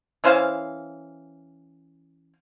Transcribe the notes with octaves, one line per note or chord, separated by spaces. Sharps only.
E3 C#4 C5 F5